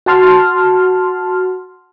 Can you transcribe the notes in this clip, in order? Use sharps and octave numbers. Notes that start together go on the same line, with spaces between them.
F#4 F#5 A5 C6 F6